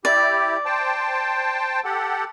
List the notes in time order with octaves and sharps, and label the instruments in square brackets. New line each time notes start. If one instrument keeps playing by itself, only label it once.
[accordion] E4 G4 [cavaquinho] D5
[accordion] C5 G5 A5
G4 A4 F#5